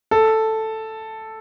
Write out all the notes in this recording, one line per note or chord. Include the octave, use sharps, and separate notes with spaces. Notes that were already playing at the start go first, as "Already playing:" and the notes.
A4